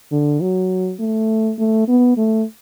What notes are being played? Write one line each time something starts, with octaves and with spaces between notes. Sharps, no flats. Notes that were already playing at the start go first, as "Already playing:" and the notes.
D3
F#3
A3
A3
B3
A3